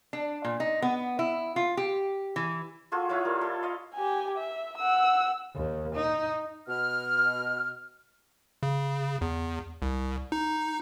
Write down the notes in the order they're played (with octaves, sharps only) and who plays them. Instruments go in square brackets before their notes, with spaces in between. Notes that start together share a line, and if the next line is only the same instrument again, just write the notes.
[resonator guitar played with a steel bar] D4
A#2
D#4
B3
E4
F4
G4
E3
[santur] F4 F#4 G#4 A4
E4 F4 C#5 F5
G3 A#4
A4
D#5 F5
[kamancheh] G4 G#5
E5
F#5 E6
[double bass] D#2
D#4
[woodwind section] B2 F6
[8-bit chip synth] C#3
E2
C2
D#4